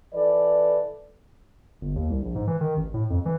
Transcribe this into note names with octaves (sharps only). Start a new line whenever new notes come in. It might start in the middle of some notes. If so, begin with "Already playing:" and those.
E3 A4 B4 D5
G1
D#2
C2
A#1
G#2
E3
D#3
A1
A2
F2
E3